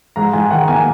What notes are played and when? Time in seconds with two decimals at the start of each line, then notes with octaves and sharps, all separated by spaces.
0.16 G#2 A#5
0.33 G#2 G#5
0.51 D#3 F#5
0.68 A#3 G#5